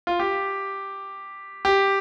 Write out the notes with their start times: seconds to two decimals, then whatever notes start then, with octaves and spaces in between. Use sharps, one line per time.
0.07 F4
0.20 G4
1.65 G4